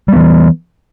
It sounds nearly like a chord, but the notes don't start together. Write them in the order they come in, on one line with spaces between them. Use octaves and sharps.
G3 B3 E3